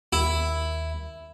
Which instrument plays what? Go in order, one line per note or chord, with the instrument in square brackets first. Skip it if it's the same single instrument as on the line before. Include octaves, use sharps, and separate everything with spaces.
[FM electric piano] D#2 [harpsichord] E4